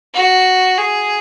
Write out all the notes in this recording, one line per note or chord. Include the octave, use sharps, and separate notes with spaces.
F#4
G#4